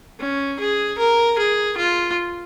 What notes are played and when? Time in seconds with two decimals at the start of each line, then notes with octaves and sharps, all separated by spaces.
0.20 C#4
0.59 G#4
0.98 A#4
1.38 G#4
1.77 F4